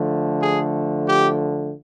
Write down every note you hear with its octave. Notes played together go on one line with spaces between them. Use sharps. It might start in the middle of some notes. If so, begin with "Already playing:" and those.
Already playing: D3 F3 A3
G#4
G4